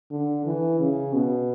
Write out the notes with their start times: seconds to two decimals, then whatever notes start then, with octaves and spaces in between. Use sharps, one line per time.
0.11 D3
0.45 E3
0.80 C#3
1.13 B2